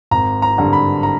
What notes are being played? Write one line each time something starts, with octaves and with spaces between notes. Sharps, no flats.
G#1 A#5
A#5
G2 D3
B5
A#5